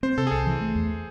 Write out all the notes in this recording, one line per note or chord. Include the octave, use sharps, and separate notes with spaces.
C4 C5
C3 A4
G#4
C2 A4
E3
A3
E2